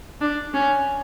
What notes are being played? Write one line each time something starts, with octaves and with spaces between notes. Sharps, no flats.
D4
C#4